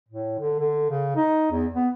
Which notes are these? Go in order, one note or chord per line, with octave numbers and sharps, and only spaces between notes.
A2
D3
D3
C#3
D#4
E2
B3